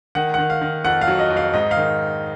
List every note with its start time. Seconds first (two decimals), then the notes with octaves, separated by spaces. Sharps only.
0.15 D#3 F#5
0.34 D#3 F#5
0.50 F5
0.61 D#3
0.84 F2 F#5
1.01 F5
1.07 F#3
1.19 D#5
1.30 F2
1.37 F5
1.53 G#2 D#5
1.71 F5
1.76 D#3